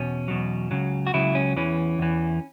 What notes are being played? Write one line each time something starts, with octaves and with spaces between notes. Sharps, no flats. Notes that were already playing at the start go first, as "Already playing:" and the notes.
Already playing: E2 B2 C#4
E2 B2 F#3
C#2 C#3 F#3
F#4
C#2 C#3 F#3 E4
C#4
E2 E3 C#4
E2 E3